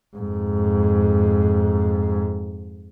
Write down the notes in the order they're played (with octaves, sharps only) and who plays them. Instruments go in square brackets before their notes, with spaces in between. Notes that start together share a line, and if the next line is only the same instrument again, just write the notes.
[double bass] F2 G#2